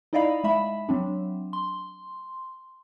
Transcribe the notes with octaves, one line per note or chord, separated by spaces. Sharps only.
D#4 E4 D5 D#5 F5 B5
G#3 E5 B5
F#3 C4 D4
C6